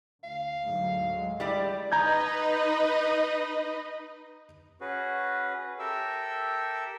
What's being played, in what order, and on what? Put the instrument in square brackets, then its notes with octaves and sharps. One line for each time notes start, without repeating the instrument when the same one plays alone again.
[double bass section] D2 [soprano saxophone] F5
[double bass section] D2 G#2 F#3
F#3 G#3
[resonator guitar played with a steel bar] G3 E4 D5
[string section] D#4 B4 D#5 [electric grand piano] A#5 G6 G#6
[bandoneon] C#4 F#4 G#4 B4
G4 A4 A#4 E5 E6